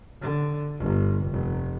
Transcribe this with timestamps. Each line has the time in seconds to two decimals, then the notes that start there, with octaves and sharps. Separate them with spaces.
0.21 D3
0.78 G1
1.24 F1